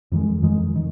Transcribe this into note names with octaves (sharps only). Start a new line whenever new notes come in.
F2 D#3 G#3
F2 D#3 G#3
D#3